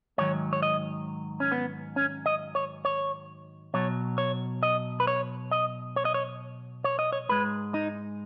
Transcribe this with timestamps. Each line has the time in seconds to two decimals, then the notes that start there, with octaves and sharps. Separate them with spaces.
0.18 G#2 D#3 F#3 C#5
0.53 C#5
0.62 D#5
1.40 C#4
1.52 B3
1.96 C#4
2.26 D#5
2.55 C#5
2.85 C#5
3.74 B2 F#3 C#5
4.18 C#5
4.63 D#5
5.00 B4
5.07 C#5
5.51 D#5
5.96 C#5
6.05 D#5
6.14 C#5
6.84 C#5
6.99 D#5
7.12 C#5
7.29 G#2 G#3 B4
7.74 D#4